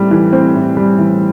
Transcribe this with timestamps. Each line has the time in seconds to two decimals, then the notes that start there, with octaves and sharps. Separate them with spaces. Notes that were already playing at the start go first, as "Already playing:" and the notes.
Already playing: A2 G3 C4
0.11 E3
0.33 C4
0.56 A2
0.77 G3
0.99 E3